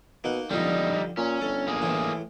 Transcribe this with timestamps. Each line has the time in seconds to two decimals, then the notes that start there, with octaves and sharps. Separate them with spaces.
0.24 B2 A#3 D#4 F#5
0.50 E1 D3 F3 G3 D#4
1.17 A#2 C#4
1.42 G1 A4
1.67 A#3 G#4
1.82 A2 E3